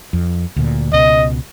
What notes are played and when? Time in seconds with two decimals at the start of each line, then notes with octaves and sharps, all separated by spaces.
0.13 F2
0.56 D2 A#2
0.93 C#2 B2 D#5